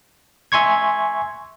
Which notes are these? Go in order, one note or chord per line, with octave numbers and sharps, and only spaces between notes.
E5 G#5 C6 C#6 G#6